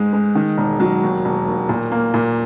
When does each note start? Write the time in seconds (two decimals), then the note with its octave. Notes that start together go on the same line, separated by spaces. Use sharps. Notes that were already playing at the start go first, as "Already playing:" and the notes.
Already playing: G#2 G#3
0.13 G#3
0.35 D#3
0.58 E1
0.80 F#3
1.03 D#2
1.25 E1
1.48 D#2
1.69 A#2
1.92 A#3
2.14 A#2